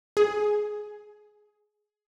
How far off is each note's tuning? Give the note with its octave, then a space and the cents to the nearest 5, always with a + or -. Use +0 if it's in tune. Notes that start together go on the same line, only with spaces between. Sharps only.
G#4 +15